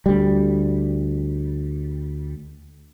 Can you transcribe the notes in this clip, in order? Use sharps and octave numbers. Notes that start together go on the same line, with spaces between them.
D2 G3